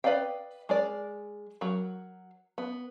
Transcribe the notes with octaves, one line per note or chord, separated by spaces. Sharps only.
B4 D5 D#5 F5 G5
G#3 A#4 D5
F#3 F#4 A#4
B3